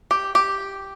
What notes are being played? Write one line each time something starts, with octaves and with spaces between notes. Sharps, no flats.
G4
G4